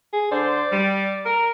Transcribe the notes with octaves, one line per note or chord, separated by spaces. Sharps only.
G#4
D3 C5 D5
G3
A#4